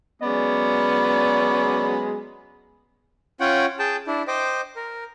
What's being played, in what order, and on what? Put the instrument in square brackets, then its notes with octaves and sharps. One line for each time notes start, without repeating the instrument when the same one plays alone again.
[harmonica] F#3 G#3 C#4 [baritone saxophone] B3 [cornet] D5
[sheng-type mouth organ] C#4 F4 C#5 F#5 G5
G#4 G5 A5
D4 E4
C5 D#5 G5 D6
A#4